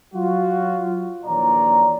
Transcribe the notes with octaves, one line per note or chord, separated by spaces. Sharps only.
F#3 F4 F#4
A#1 D#2 E3 C#5 D5 A#5